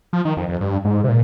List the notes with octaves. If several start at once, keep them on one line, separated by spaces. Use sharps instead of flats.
F3
D#3
F2
F2
G2
G#2
C3
A#2